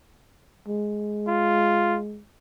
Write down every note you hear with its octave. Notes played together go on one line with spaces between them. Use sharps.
G#3
F4